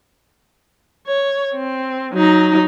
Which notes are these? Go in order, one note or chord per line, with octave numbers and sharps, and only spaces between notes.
C#5
C4
F#3 D#4